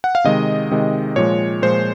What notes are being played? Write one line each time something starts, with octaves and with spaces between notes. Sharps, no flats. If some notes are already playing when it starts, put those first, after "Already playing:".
F#5
F5
C3 D#3 G#3 D#5
C3 D#3 G#3
A#2 F3 G#3 C#5
A#2 F3 G#3 C5